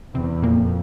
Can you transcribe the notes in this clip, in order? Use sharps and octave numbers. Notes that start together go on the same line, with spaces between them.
E2 C3 C4
F2 A#2 A#3